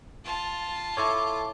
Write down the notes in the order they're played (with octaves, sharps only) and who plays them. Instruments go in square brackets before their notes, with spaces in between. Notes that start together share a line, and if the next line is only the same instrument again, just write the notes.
[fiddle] F4 A5
[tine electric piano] E4 A4 C#5 [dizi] D6